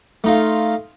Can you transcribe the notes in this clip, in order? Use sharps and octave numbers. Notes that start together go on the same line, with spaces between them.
A3 D#4 F4